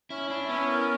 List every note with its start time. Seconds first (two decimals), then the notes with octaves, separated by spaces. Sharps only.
0.10 C#4 E4
0.30 D4 E4
0.49 B3 C#4
0.68 A#4